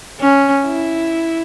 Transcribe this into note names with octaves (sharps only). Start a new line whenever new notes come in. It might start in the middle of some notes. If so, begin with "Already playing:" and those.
C#4
E4